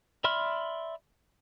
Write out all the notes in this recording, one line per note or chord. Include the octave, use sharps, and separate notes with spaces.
D5 E5 B5 C6 F6